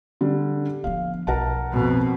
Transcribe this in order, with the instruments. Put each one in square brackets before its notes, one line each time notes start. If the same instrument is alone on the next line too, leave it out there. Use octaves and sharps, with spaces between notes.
[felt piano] D3 G3
[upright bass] F3 B3 [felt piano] F5
[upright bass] B1 [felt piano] A#4 F#5 A5
[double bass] F2 B2